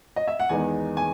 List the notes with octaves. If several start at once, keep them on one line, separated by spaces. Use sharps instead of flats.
D#5
E5
F#5
E2 D#3 G#3 B3 D#4 G#5
G#5